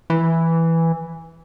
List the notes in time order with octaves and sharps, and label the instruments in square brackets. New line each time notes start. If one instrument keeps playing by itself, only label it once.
[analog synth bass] E3